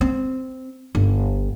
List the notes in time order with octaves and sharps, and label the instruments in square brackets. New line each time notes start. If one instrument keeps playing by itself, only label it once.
[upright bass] C4
G1